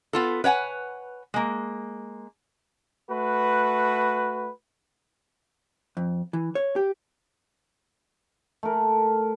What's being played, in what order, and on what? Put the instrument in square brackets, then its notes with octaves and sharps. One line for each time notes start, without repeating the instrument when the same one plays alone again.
[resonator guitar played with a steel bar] B3 F4 A4
B4 C#5 F#5 G#5
G#3 A#3
[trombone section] A3 F#4 B4
[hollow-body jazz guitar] F2
E3
C#5
G4
[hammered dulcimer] A3 A#4